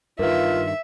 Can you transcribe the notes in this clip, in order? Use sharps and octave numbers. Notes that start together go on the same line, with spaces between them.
G2 D#3 F4 A#4 B4 E5 F5